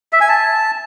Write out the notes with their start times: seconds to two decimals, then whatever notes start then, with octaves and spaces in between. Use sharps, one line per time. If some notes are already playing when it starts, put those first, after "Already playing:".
0.13 E5
0.21 G#5
0.29 A5